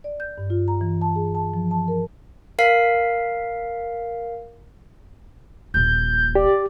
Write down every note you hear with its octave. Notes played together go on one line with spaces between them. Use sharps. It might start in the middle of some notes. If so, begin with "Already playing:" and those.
D5
G6
G2
F4
A#5
E3
A5
G#4
A5
F3
A5
A#4
A#4 F5 C7
D#1 A#1 G6
G4 D5